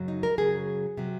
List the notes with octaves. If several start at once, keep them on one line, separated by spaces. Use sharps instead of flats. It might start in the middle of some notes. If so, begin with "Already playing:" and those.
Already playing: F#2 C#3 F#3
D#4
A#4
F#2 C#3 F#3 G#4
C3 F#3